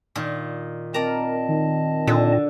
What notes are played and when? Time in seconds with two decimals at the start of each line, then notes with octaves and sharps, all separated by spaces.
0.15 A#2 D#3
0.94 C4 A#4 D5 D#5 A5 A#5
1.48 D#3
2.07 A#2 D3